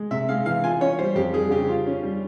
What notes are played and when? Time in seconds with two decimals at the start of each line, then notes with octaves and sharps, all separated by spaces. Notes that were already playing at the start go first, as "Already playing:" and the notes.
Already playing: G#3
0.11 C3 E5
0.29 G#3 F5
0.46 E3 F5
0.64 F4 G#5
0.81 C#4 C#5
0.99 G3 C5
1.15 F2 G4
1.33 G3 G#4
1.51 C#3 G4
1.69 F4
1.87 C#4
2.03 G3